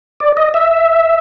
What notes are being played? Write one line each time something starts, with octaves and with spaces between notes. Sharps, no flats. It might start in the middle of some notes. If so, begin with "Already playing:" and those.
D5
D#5
E5